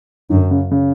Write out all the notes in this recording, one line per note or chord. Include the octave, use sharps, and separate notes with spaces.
F#2 D3
C#3
C#3